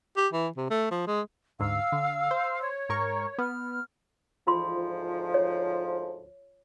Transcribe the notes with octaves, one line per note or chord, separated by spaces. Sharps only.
G4
E3
C3
A3
F3
G#3
D2 G#2 F5 E6
D3
C5
C#5
G#2 A#4 C#6
B3 F6
D2 G#2 F3 F4 C6
C#5